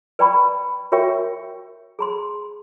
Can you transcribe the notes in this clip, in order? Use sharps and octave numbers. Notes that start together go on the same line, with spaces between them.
B4 D5 G5 A#5 B5 C#6
F#4 A#4 C#5 E5 G5 C#6
G#4 A#5 C6